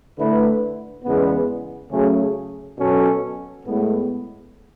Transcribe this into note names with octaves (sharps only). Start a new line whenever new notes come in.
D3 A3 E4 B4
E2 C#3 G#3 B3
C#3 F#3 A3 C#4 G#4
B2 F#3 C#4 F#4 A4
A2 G#3 B3